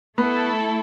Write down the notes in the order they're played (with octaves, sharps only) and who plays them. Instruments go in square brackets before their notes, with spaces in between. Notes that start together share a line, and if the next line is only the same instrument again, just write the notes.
[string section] A3 E4 A4 [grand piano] B3